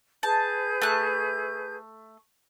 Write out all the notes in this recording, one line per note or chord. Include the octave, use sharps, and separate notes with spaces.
G#4 B4 A5 G6
A3 F#6